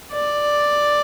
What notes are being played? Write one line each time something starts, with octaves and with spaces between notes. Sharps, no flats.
D5